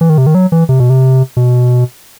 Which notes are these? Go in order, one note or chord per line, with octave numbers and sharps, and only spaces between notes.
E3
D#3
C3
D#3
F#3
E3
C3
B2
C3
B2